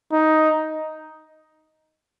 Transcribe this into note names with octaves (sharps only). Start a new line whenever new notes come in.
D#4